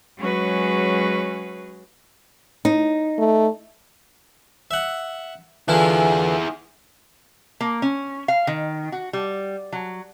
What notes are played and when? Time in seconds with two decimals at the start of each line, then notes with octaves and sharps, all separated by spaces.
0.18 F#3 G#3 C#4 F#4 G#4 B4
2.65 D#4
3.18 A3
4.71 E5 F#5
5.68 D3 E3 E4 F4 G#4
7.61 A#3
7.82 C#4
8.28 F5
8.47 D#3
8.92 F#4
9.13 G3
9.73 F#3